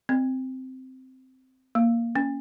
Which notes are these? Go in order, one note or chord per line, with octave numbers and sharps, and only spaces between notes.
C4
A#3
C#4